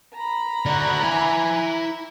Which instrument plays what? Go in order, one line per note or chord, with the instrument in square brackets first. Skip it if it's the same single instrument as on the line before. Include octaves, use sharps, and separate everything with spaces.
[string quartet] A#5 B5
[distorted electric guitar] D3 F#4
E4 G#5